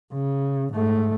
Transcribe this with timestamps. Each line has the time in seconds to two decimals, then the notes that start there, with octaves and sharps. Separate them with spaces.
0.13 C#3
0.73 G#2 A3